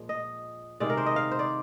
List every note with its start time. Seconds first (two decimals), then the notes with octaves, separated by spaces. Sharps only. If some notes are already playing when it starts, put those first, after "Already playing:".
Already playing: A#2 F3 G#3
0.09 D#5
0.80 C3 D#3 G#3 D5
0.90 A#4
0.97 C5
1.06 D#5
1.16 F5
1.31 C5
1.39 D5